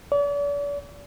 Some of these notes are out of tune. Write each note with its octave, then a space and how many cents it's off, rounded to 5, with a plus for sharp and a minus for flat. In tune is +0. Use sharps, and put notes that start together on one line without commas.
D5 -40